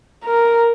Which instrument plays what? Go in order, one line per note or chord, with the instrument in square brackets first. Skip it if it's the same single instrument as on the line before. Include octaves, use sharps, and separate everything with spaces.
[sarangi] A#4